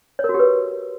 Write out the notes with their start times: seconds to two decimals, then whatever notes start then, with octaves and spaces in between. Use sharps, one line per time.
0.19 C#5
0.24 A#4
0.29 F#4
0.34 G4
0.39 B4